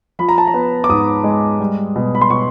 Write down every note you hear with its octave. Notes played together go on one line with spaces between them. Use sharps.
F3 B5
A#5
A5
A#5
B3
D6
G#2 D#6
G#3
G3
B2
B5
C6
B2 C#6